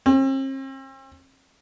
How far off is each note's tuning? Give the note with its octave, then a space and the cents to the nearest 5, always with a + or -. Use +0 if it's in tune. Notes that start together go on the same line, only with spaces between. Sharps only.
C4 +45